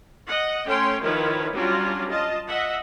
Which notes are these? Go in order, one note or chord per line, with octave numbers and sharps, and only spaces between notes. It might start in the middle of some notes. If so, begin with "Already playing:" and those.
D#5 F#5
A3 C#4 C#5 G5 C6
D#3 F3 E4 B4 C#5
F#3 G3 C#4 D4 F4 F#4
F4 D#5 A5
D#5 E5 F#5